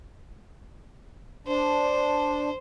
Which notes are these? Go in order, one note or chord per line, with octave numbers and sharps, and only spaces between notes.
D4 C5